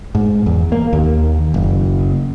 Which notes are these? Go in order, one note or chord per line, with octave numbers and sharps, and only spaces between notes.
G#2
E2
A#3
D#2
F#1